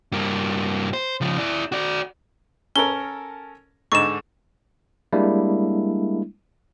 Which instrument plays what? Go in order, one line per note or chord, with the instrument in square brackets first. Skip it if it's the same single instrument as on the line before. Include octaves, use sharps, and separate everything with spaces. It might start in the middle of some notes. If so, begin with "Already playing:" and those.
[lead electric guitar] G2 A#3
C5
C#3 F3
E4 D5
F#4 D5
[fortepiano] C#4 A4 A#4 [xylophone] G7
[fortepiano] G#2 D3 D#4 [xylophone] C#6 E7
[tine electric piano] G3 G#3 A#3 D4 E4